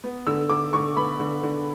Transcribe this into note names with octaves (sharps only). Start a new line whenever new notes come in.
B3
D3 E6
D3 D6
D3 C#6
B3 B5
D3
D3